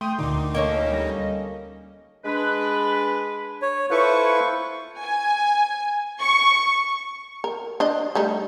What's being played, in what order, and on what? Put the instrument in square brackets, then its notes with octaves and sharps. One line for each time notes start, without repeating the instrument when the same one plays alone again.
[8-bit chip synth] A3 [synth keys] G5 D#6 [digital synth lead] C6
[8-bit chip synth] D2 D#4 [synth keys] A#2 D3 D6
[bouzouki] A#3 C#4 A4 [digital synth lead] D#5
[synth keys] G3 A#6
[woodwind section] G#3 D4 B4
[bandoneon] C#5
[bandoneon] E4 A4 B4 [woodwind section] F4 C5 C#6
[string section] G#5
C#6
[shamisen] A#4
D4 D#5
G3 A3 D#4